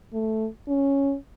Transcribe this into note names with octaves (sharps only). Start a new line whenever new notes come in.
A3
C#4